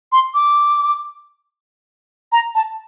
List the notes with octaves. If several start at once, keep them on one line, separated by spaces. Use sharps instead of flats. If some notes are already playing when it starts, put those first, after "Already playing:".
C6
D6
A#5
A5